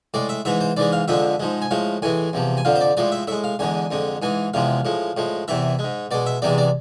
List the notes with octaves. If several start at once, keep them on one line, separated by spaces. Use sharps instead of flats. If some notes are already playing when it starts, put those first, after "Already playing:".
A2 G#3 D5
E5
G#2 E3 G#3 E5
C5
G#2 E3 G#3 D5
F5
F2 D3 F3 G#3 E5
G#2 F3 G#3
G#5
A2 F3 G#3 F5
A2 E3 G#3 G#5
E2 C3 F3
G#5
F2 D3 F3 F5
C5
D5
A2 F3 G#3 D5
E5
A2 G#3 E5
F5
E2 D3 G#3 G#5
F2 D3 G#3
G#2 E3 G#3 G#5
E2 C3 F3 G#3 F5
A2 F3 G#3
A2 F3 G#3
E2 C3 E3 E5
G#3
G#2
B2 G#3 D5
E5
E2 C3 E3 G#3 D5
D5